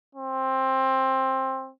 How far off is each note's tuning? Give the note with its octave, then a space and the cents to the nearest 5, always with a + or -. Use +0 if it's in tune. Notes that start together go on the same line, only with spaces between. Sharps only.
C4 +15